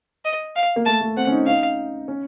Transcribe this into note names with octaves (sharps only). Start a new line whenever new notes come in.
D#5
F5
A#3
A3 A5
A3
C4 F#5
C#4
D#4
D#4 F5
C#4